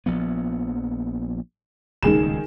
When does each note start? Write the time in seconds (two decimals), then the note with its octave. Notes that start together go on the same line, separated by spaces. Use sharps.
0.06 A#1 F3 B3
2.03 D#1 C#2 B2 D#3 G#4 E7